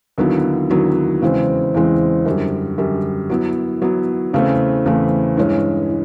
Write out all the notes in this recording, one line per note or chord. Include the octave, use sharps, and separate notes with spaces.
D#2 D3 F#3 B3 E4
D#2 D3 F#3 B3 E4
E2 C#3 E3 G#3 C4
E2 C#3 E3 G#3 C4
F#2 D3 G3
F#2 D3 G3
F#3 B3 E4
F#3 B3 E4
E2 C#3 E3 A3 C4
E2 C#3 E3 A3 C4
G2 E3 G#3 C#4
E3